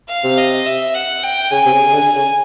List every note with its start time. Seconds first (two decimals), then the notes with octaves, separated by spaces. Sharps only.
0.09 F5
0.24 C3
0.37 D#5
0.66 E5
0.94 F#5
1.23 G5
1.51 C#3 G#5
1.65 C3
1.72 C#3
1.87 C#3
1.94 D3
2.15 C#3